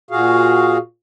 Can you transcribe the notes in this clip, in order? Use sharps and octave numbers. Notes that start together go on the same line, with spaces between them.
A#2 F#4 G#4 F5